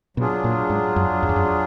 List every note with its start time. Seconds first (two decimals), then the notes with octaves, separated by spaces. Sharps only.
0.17 B2 F#3 D4 F4 G#4
0.44 A#2
0.70 G#2
0.96 F#2
1.23 F#2
1.29 F2
1.36 F#2